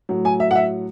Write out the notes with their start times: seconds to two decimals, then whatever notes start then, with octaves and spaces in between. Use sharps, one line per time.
0.09 A2 F#3
0.25 G#5
0.40 E5
0.51 F#5
0.55 E5